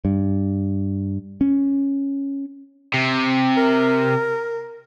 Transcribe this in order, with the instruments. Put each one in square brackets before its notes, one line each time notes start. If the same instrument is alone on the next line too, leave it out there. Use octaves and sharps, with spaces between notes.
[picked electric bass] G2
C#4
[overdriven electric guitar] C3
[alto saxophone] A#4